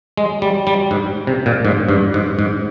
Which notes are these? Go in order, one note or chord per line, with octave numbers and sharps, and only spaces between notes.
G#3
G3
G3
G#2
C3
A#2
G#2
G2
G#2
G#2